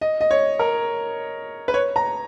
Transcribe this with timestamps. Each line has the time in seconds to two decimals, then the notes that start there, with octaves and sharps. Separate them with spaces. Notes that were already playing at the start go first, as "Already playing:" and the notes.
0.01 D#5
0.21 D#5
0.31 C#5
0.59 A#4
1.68 B4
1.74 C#5
1.96 A#5